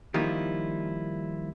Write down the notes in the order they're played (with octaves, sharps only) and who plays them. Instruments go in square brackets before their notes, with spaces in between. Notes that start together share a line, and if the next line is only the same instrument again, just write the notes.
[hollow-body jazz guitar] D#3 F3 G3 A#3 E4 F4